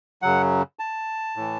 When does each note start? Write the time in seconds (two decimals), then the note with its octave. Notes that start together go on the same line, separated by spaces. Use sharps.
0.22 F#2 C#3 F#3 F#5
0.79 A5
1.36 A2 E3